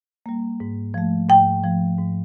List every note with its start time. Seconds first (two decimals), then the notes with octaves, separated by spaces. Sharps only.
0.26 G3 A#3
0.60 G#2
0.94 F3 A3
1.29 G#2 G5
1.64 F3 A3
1.98 G#2